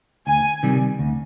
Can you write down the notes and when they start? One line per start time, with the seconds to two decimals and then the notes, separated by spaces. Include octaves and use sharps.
0.27 D2 G#5
0.63 C3 D#3 G3
0.99 D2